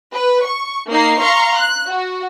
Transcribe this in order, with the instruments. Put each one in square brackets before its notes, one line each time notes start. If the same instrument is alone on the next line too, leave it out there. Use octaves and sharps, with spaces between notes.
[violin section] B4
C#6
A#3 D#4 C7
F5 A#5 C6 C#6
F#6
F#4